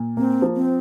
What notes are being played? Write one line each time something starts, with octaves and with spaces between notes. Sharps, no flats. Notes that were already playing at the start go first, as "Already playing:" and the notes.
Already playing: A#2
A#3 C4
F3
C4